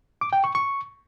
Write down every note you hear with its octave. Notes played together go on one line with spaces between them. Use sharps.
D6
G5
C#6
C#6